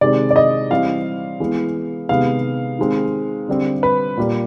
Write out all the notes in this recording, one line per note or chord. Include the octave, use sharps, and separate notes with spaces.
C3 D#3 G#3 C4 D5
D5
D#5
E3 G3 C4 F5
E3 G#3 B3
C3 D#3 G#3 B3 F5
D#3 G#3 C4
D3 G3 C4
B4
A#2 G3 A#3